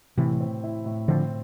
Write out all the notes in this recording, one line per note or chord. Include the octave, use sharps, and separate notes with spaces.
A2 C3 E3
C4
E4
A2
D3 F3 C4